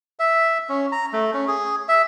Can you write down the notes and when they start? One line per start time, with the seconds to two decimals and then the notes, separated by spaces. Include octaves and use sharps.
0.19 E5
0.69 C#4
0.92 A#5
1.13 A3
1.34 C#4
1.48 G#4
1.88 E5